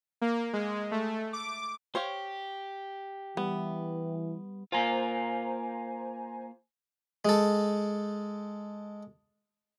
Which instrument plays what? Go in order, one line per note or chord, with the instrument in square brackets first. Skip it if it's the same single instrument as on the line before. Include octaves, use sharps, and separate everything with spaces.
[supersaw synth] A#3
G#3
A3
D6
[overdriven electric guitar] G4 [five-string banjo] C5 C#5 F5
[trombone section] E3 [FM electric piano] G3 [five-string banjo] B3
[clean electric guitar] A#3 F4 [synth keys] C5 G#5 A#5
[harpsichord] G#3 A4